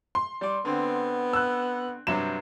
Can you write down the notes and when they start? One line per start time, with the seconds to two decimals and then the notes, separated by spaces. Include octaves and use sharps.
0.15 C6
0.41 G3 D5
0.65 D3 B3 C4
1.33 E6 F#6
2.07 G2 C3 F#3 E7